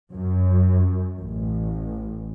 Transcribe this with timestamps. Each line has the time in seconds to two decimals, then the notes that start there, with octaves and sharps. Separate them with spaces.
0.11 F#2
1.19 A1